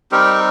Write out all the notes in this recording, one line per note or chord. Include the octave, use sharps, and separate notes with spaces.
G3 C4 D#4 G4 A#4